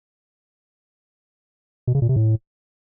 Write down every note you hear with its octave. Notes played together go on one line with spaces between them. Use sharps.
B2
C#3
A#2
C3
A2